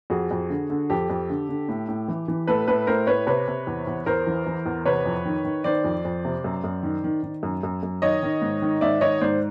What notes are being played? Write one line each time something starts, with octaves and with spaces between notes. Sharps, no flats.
F2 F#4 G#4
F2
D3
D3
F2 G4 A4
F2
D3
D3
A2
A2
E3
E3
A2 A4 B4
A2 A4 B4
A2 A#4 C5
A2 B4 C#5
C3 B4 C#5
C3
E2
E2
E2 A#4 C5
E3
E3
E2
C3 B4 C#5
F2
D#3
D#3
D#3 C5 D5
F2
F2
C3
F#2
F#2
D#3
D#3
D#3
F#2
F#2
F#2
D#3 C#5 D#5
D#3
G#2
D#3
G#2 D5 E5
D#3 C#5 D#5
G#2 C5 D5